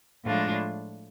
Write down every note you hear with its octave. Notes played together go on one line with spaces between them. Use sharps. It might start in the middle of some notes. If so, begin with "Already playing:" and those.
A2 F3 G#3 D4 F4